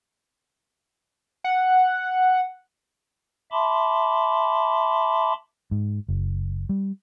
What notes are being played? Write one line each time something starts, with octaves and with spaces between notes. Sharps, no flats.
F#5
E5 A5 B5 C6 D6
G#2
F#1
G3